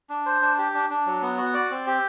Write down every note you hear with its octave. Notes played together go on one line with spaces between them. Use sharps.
D4
C5
D4
G4
D4
D4
F#3
B3
F#4
D5
C4
G4